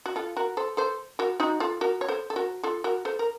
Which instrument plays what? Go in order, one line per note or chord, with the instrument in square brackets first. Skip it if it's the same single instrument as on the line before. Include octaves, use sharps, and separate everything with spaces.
[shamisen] F#4
F4 A4
F#4 A#4
A4 C5
A4 C5
F#4 A#4
D#4 F#4
F4 A4
F#4 A#4
C#5
A4 C5
A4
F#4 A#4
F4 A4
F#4 A#4
A4 C5
A#4